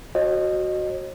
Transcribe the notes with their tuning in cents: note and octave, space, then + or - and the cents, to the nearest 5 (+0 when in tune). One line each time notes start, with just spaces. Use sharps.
F#4 +0 C5 +45 D#5 -25